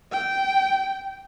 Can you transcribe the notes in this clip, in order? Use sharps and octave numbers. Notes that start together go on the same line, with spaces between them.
G5